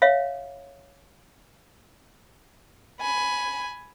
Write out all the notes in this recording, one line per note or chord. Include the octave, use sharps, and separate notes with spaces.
C#5 E5 F5
G#5 B5